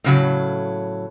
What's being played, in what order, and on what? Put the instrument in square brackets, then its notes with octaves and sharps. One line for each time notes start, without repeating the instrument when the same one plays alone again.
[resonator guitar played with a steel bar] A2 C#3 F#3